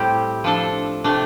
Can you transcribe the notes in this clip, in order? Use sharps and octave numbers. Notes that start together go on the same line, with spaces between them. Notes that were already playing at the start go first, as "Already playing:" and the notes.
Already playing: A2 G3 C4 G4
F3 D4 A4
C3 A3 D4